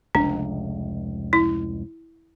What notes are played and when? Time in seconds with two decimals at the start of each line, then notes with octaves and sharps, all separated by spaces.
0.15 F1 C#2 D4
1.33 E4